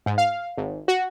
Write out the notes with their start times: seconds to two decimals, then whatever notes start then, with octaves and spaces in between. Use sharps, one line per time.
0.06 G#2
0.18 F5
0.57 G#1
0.88 F#4